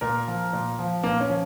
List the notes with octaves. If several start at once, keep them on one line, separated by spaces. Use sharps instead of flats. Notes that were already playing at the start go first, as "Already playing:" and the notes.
A#2 A#4
F3
A#2
F3
A#2 A#3
C#4
F3